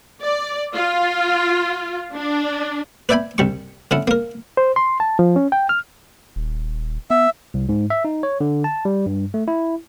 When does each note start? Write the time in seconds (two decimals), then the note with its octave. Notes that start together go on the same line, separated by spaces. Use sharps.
0.21 D5
0.75 F4
2.14 D4
3.09 B4 D5 E5 G5 G#5 B5
3.38 C2 G3 C#6
3.91 D3 C#4 E4
4.07 A#3 A#4
4.57 C5
4.76 C6
5.00 A5
5.19 F3
5.36 C#4
5.52 G5
5.69 F6
6.36 D#1
7.10 B3 E5
7.54 C2
7.69 G#2
7.90 E5
8.05 D#4
8.23 C#5
8.41 D3
8.64 A5
8.85 G3
9.06 G2
9.34 A3
9.48 E4